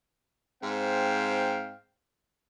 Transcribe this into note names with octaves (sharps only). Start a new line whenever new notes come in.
G#2 C4 F5 G5